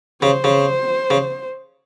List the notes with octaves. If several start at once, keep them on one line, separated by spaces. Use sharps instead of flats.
C#3 C5
C#3
C#3